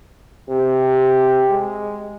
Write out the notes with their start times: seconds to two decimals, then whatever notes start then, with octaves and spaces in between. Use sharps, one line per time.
0.49 C3 G4
1.50 G#3